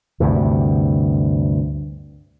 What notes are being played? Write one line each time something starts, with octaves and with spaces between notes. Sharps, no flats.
D2 G2 C3